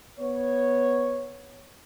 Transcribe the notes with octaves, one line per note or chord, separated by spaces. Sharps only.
B3 C#5